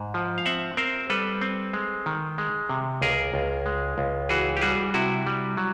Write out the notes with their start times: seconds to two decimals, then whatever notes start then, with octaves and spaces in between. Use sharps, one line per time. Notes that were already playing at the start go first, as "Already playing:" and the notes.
Already playing: G#2
0.14 F3
0.38 F5
0.46 C4 E5 F#5
0.77 C4 A#4 C5
1.10 G3 A4 B4
1.41 C4
1.73 G#3
2.06 D#3
2.38 G#3
2.69 C3
3.02 C#2 G#4 A#4
3.34 C#2
3.66 G#3
3.98 C#2
4.29 E3 F#4 G#4
4.57 G4
4.61 G3 F#4 G#4
4.94 C3 E4 F#4
5.27 G3
5.57 F#3